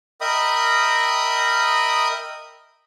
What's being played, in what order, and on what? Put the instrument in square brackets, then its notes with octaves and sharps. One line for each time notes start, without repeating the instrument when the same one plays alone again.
[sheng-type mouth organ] A#4 D#5 E5 G5 B5 D#6